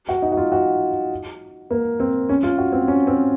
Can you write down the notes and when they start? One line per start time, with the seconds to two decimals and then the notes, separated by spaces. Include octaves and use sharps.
0.09 F#4
0.22 D#4
0.32 F#4
0.37 F4
0.52 F#4
1.71 A#3
2.00 C4
2.29 C#4
2.43 F4
2.58 F#4
2.72 C4
2.88 C#4
3.07 C4